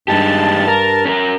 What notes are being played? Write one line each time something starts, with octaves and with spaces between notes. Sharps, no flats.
G2 G#3 D#4 G4 A5
A#4
C#4 A4 A#4